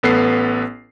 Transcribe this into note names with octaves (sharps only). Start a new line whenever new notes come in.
A1 B3 A4 B4 C7